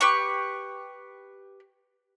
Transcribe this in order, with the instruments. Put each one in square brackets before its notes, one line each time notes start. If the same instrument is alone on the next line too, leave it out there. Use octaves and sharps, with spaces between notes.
[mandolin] G4 B4 C#6